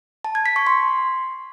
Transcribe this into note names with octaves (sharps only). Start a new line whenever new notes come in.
A5
G#6
B6
C#6
C6